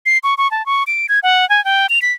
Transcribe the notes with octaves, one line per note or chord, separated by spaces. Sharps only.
C7
C#6
C#6
A5
C#6
D7
G#6
F#5
G#5
G5
F7
B6